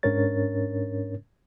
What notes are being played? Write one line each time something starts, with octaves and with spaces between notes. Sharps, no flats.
G#2 C#4 D4 A#4 C#5 A6